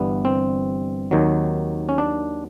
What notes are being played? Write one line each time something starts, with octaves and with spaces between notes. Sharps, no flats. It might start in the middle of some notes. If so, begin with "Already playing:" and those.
Already playing: G1 G2 E3 G3 B3
C4
D#2 D#3 F#3
C#4
D4